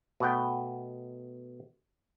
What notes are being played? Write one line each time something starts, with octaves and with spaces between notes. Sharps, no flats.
B2 A3 F#5 G5